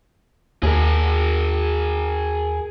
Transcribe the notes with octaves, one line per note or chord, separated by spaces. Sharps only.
D#2 G#4 A#4